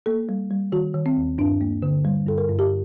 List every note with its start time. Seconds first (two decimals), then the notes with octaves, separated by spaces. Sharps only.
0.06 A#3 A4
0.29 G3
0.51 G3
0.72 D#3 F#4
0.94 D#3
1.06 C4
1.17 D#2
1.38 G2 D4
1.61 A#3
1.82 D3
2.05 G3
2.27 G2 A4
2.38 A#4
2.49 G2
2.59 G4